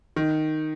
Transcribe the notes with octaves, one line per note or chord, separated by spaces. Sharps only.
D#3